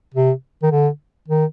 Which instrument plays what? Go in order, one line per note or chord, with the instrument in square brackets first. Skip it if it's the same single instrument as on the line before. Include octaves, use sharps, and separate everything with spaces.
[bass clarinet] C3
D#3
D3
D#3